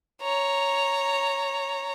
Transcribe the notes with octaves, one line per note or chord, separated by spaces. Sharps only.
C#5 A#5